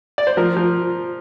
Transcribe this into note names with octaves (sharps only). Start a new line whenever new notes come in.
D5
C5
F3 A#4
F3